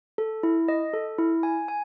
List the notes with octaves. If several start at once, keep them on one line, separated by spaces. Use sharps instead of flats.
A4
E4
D#5
A4
E4
G#5
G#5